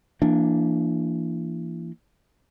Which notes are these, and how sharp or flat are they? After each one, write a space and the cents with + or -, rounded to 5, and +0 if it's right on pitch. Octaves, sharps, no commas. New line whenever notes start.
E3 +35 A#3 +0 D4 +0